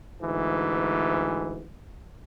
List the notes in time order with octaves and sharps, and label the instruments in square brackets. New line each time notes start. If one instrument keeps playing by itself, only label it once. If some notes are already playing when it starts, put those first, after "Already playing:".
[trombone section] D2 G#2 E3